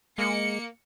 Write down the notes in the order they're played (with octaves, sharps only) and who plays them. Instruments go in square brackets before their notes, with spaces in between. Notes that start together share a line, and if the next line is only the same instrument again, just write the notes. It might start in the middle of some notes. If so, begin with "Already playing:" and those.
[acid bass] G#3 [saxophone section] A#3 [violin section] C#7